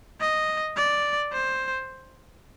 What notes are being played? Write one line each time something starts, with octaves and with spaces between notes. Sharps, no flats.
D#5
D5
C5